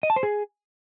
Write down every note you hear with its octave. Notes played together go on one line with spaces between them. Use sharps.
D#5
A5
C5
G#4